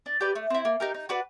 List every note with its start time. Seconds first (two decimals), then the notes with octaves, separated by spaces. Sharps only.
0.06 D4
0.21 G4 B4 D5
0.35 A3
0.50 C4 E4
0.65 A#3
0.80 D#4 G4 A#4
0.94 D#4
1.09 F#4 B4 D5